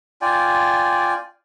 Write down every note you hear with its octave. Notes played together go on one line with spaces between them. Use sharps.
F4 D5 G5 G#5